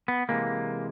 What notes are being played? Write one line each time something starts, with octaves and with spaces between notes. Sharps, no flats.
B3
C3 E3 G#3 A#3